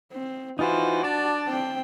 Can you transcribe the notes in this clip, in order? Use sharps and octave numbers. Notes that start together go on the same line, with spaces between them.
C4
E3 D#4 F4 F#4 C5
D4 D5 A5
C4 G5